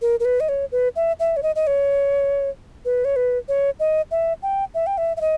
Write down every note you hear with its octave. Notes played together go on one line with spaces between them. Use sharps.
A#4
A#4
B4
D#5
C#5
B4
E5
E5
C#5
D#5
D#5
C#5
B4
C#5
B4
C#5
D#5
E5
G5
E5
G5
E5
E5
D#5